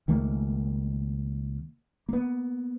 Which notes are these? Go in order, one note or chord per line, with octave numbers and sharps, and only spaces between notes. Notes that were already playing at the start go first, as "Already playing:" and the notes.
C#2 D#3 A3 A#3
A#3 B3